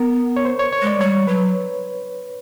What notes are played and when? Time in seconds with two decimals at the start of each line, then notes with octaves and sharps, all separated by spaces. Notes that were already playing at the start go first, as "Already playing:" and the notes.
Already playing: B3 A#4
0.36 C#5
0.45 C5
0.59 C#5
0.72 C#5
0.82 G#3 D5
1.00 G3 C#5
1.27 F#3 B4